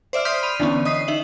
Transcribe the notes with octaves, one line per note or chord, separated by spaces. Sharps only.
C5 D5 E5 F6
C6 D#6 F6 G6 B6 C7
B5 D#7 F7
D3 E3 B3 C#4
D#5 D#6 B6 C7
D#4 E5 F#7